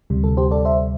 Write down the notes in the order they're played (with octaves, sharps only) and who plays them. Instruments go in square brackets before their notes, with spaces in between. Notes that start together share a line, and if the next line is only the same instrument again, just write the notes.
[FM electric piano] D2 C3 G3
A4
G4 C5
A4 D5
C5 E5